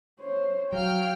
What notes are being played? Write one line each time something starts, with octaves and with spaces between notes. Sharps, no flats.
C5 C#5
F#3 F#4 F5 G5 F6